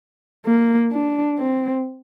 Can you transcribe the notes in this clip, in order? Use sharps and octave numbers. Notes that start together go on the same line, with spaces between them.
A#3
D4
C4